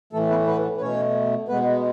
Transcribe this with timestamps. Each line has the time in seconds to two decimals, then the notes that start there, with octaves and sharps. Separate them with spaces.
0.13 A2 E3 A3 A4
0.30 B3 B4
0.47 B3 B4
0.77 B4
0.81 B2 A3 C#4 C#5
1.48 B2 G#3 B3 B4